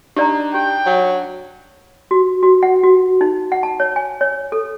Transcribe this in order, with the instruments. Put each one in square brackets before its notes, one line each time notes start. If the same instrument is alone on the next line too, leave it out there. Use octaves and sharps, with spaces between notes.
[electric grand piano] D4 D#4 [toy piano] G4 D5 A#5
[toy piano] G4 [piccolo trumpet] G5
[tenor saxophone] F#3
[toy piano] F#4
F#4
F#5
F#4
D#4
F#5
A5
C#5
G#5
C#5
A4